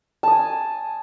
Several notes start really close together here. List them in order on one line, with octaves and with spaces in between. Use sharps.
A5 D#6 G#5